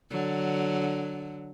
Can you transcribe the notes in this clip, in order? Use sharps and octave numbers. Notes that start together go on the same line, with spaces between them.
D3 F#3